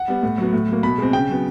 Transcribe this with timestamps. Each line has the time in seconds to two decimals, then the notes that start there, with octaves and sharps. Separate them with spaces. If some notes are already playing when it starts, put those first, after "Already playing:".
Already playing: F#5
0.08 G3 B3
0.23 A2
0.38 F#3 B3
0.53 A2
0.68 F#3 A#3
0.83 B2 B5
0.98 G#3 C4
1.13 C#3 G5
1.29 F#3 B3